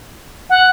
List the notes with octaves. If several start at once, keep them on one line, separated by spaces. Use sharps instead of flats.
F#5